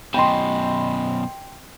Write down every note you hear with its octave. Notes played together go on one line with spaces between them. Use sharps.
F#2 B2 D#5 G5 B5 C6